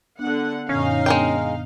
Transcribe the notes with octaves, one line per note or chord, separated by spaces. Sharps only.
D3 B3 D4 F#5
F#2 A#2 D3 C#4 D#4 F5
G#3 B3 D4 A#4 G5